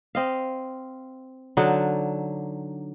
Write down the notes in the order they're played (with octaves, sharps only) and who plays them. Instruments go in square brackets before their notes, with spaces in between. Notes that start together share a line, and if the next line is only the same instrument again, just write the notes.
[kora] C4 D#5 F5
D3 F#3 D4 D#4